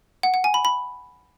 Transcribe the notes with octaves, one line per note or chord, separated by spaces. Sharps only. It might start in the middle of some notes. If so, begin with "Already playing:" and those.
F#5
F#5
G#5
B5
B5